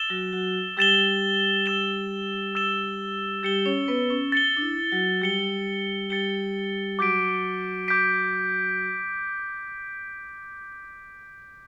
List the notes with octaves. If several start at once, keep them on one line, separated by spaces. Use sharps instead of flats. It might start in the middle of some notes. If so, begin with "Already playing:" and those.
Already playing: E6 A6 E7 G7
F#3 F#4
F#3 F#4
G3 G4 E6 A6 E7 G7
E6 A6 E7 G7
E6 A6 E7 G7
G3 G4 A6 C#7 G7
C#4 C#5
B3 B4
C#4
A6 C#7 G7
D4
E4
F#3 F#4
G3 G4 A6 C#7 G7
G3 G4 A6 C#7 G7
F#3 F#4 D6 G6 B6 D7
D6 G6 B6 D7